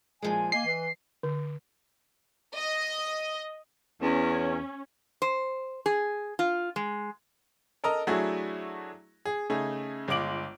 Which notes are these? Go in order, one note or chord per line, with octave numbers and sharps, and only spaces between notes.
A#2 F3 G#3 G#5
A#3 D#5 G#5 C7
E3
D3
D#5
E2 C#4
C5
G#4
F4
G#3
A4 A#4 D#5 A#5
F#3 A3 D4 E4 F#4 G#4
G#4
C#3 A3 D#4 G#4
G1 G#3 F4 D6 D7 F#7